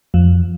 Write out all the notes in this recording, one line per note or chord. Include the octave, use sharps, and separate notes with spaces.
F2 F3